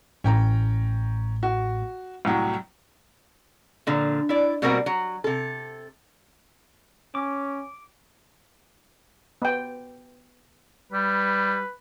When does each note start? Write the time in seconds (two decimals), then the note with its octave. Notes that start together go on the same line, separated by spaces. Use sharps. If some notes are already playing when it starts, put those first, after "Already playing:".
0.24 A1 A2 C#4 G5 A#5
1.43 F#4
2.25 C2 A2 F#3
3.87 A#2 D3 F3
4.29 E4 D5
4.62 B2 G3 A#3 C4 F#4 A#4
4.86 F#3
5.24 C3 A4
7.15 C#4 D6
9.42 B3 G5
10.92 G3 B4